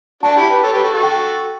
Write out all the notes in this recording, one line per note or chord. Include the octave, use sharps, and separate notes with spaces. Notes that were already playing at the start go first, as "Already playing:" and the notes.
D4 F#4 A5
E4 G4
G4 B4
A4 C#5
G4 B4
F#4 A4
F#4 A4
G5